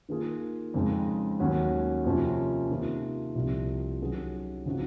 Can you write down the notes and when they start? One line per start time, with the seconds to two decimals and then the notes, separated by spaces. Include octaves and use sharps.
0.09 D#3 A#3 F4 G#4
0.74 F2 C#3 G#3 D#4
1.39 D#2 D#3 F#3 C#4 F#4
2.04 F2 C3 F3 A#3 C#4
2.70 C3 D#3 A#3 F4
3.35 C2 C3 F3 C4 F4
4.01 D#3 F#3 C#4 G#4
4.66 C#3 F3 C4 D#4 F#4